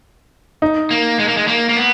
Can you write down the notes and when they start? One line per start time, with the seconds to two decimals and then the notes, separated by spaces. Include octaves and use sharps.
0.62 D#4
0.91 A#3
1.19 G#3
1.28 A#3
1.37 G#3
1.48 A#3
1.69 A#3
1.77 B3